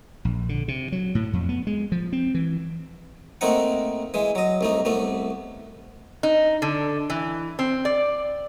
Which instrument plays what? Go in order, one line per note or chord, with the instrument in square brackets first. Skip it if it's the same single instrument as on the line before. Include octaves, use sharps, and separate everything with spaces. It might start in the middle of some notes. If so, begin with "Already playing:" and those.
[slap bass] A#1
D3
C3
F#3
A2
F2
B3
G#3
F3
C4
E3
[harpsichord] A3 A#3 C4 D#4 F#5
E3 G#3
F#3 D#5
C2 A3 D#4
C2 A3 B3
[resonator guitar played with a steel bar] D#4
D3
E3
C4
D5